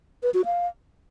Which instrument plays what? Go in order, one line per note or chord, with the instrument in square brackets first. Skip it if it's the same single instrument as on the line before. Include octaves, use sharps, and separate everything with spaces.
[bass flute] B4
F#4
F5